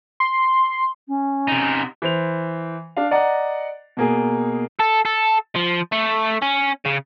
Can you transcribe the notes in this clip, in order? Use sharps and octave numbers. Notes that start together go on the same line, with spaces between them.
C6
C#4
C3 D#4
E3 C5 F7
D4 F5
D5 D#5 F#5 A#5
B2 A#3 G#4
A4
A4
F3
A3
C#4
C#3